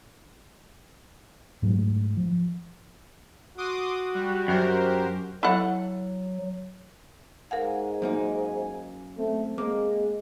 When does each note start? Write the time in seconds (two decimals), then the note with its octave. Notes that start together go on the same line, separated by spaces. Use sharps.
1.62 G#2 F#3 G#3 A3
2.17 F3
3.58 F#4 C6 D6 D#6
4.15 G3
4.48 F#2 G4 A#4 C5
5.43 F#3 E4 A4 F#5
7.51 G#2 A#4 F5 F#5 G#5
8.02 F#2 A#3 D#4
9.18 A3 C4
9.58 G#3 A#3 D6